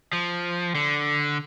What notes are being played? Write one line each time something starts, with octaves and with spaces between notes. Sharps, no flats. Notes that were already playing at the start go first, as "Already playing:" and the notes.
F3
D3